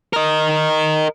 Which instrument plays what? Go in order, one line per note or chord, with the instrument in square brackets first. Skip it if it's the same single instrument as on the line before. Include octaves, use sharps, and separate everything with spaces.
[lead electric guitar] A#4 D#5